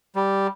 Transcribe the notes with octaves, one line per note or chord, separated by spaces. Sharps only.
G3